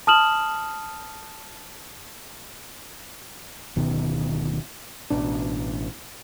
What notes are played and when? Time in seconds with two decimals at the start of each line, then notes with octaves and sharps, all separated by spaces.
0.07 A5 D#6 F6 E7 F#7
3.76 D1 B2 D#3
5.10 A1 B2 D4